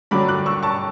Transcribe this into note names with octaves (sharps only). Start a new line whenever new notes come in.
G2 D3 F#3 B5 D6
D6 F#6
C#6 E6
A5 C#6